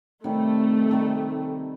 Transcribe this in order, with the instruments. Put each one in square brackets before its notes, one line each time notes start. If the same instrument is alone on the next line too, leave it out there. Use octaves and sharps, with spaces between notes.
[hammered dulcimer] C3 D#3 G3 [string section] A3
[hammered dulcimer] C3 D#3 G3